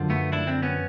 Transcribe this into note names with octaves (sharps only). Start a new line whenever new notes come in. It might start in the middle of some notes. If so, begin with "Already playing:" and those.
Already playing: F#2 D3 F3
A3 B3
D4 E4
C4 D4
B3 C#4